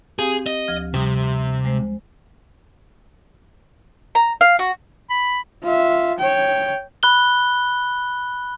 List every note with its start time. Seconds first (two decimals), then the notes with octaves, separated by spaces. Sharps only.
0.19 C4 G4 G#4 F5
0.46 D#5
0.68 D2 F3 F6
0.94 C3 G3 D#6
1.65 G#3 C5
4.15 A#5
4.41 F5
4.59 F#4
5.10 B5
5.64 F4 E5
6.18 C#5 G5
7.03 B5 F#6 G7